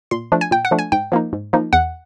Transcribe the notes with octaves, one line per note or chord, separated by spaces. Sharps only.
A#2 C6
F3 A3 D4
G#5
A#2 G5
F#5
F3 A3 D4
G#5
G#2 G5
F3 A#3 D#4
G#2
F3 A#3 D#4
E2 F#5